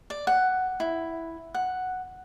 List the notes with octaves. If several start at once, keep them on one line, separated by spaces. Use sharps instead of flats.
D5
F#5
E4
F#5